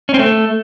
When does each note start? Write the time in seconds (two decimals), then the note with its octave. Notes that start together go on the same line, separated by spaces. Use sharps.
0.09 C#4
0.14 C4
0.19 A3